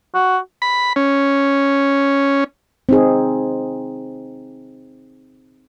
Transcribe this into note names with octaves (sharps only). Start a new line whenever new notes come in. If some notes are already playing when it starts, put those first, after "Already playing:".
F#4
B5
C#4
C4 D#4 G#4